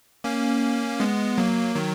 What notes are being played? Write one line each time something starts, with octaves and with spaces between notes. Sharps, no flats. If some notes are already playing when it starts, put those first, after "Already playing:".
A#3 C#4
G#3 B3
F#3 A#3
D#3 F#3